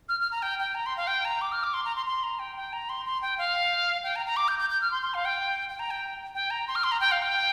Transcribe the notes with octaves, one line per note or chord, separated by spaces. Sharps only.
F6
F6
A#5
G5
G5
A#5
C6
F5
G5
A#5
D6
F6
D6
C6
A#5
C6
C6
A#5
G5
G5
A#5
C6
C6
G5
F5
G5
A#5
A#5
D6
G6
G6
G6
F6
C6
C6
F5
G5
G5
A#5
G5
G5
A#5
C6
F6
C6
A#5
G5
F5
G5